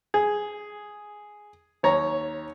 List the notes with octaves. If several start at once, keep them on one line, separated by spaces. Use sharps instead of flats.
G#4
D#2 C#5 A#5